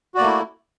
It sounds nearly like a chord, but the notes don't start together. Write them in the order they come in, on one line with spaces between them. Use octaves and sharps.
F#4 D5 A#3 A3 E4